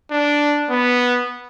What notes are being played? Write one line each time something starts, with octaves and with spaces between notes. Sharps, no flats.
D4
B3